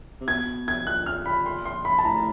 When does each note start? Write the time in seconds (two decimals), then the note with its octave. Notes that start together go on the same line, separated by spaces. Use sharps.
0.20 C3
0.28 B2 G#6
0.68 G#6
0.87 A#2 F#6
1.06 F6
1.26 B5
1.46 C6
1.65 C6
1.85 B5
1.98 A5
2.04 A2 A#5